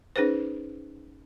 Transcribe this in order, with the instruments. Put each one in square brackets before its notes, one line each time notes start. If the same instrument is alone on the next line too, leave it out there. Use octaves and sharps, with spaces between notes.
[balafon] C#4 D#4 G#4 B4 C5